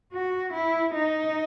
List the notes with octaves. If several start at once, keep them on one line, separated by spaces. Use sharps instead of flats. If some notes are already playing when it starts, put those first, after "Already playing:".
F#4
E4
D#4